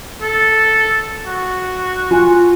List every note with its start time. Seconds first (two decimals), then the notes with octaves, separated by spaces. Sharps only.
0.21 A4
1.26 F#4
2.11 F4 G#5